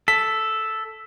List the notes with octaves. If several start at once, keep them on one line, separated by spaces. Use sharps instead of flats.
A4 B6